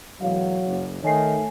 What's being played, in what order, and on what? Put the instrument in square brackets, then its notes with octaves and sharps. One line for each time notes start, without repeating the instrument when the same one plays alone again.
[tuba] E1 [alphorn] F#3 [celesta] F5
[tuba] F#1
[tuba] D#3 [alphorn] A3 [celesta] C#5 G#5 C7